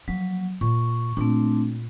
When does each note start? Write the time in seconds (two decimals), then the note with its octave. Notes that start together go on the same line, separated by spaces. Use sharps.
0.08 F3 F#3 A#3
0.61 A#2 C#6
1.17 A#2 A3 C4 D4